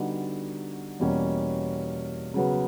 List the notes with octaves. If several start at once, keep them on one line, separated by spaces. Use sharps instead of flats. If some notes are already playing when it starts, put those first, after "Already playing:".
Already playing: D3 G3 B3 D#4 F#4
E2 B2 G3 A#3 C#4
C#3 F#3 B3